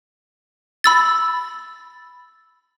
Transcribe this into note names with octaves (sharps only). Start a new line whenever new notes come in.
B5 E6 A6